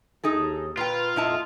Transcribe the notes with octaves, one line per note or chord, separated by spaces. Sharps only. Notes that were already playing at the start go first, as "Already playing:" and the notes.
D#2 D#4 G#4 A4
A#2 F4 B4 G5
F2 A#2 E4 D#5 A5